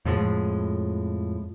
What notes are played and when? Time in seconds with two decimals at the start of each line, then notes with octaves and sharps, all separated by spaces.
0.05 F2 A2 F3 G#3